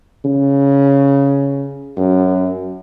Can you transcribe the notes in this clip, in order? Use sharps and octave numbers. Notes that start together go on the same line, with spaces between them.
C#3
F#2